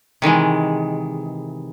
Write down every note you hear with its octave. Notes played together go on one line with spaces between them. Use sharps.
C3 D#3 E3 G#3